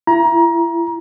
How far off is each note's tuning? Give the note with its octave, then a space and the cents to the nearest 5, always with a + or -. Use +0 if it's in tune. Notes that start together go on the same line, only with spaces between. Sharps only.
E4 +35 A#5 +25